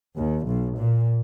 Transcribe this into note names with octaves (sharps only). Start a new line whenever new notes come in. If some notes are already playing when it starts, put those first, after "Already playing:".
D#2
B1
A#2